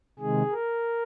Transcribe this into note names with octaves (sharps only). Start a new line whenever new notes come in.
C3 D#3 G#3 G#4
A#4